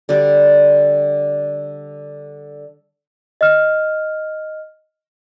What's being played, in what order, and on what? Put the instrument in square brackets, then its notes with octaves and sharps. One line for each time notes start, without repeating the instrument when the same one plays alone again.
[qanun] D3 G3
[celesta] D#5 F6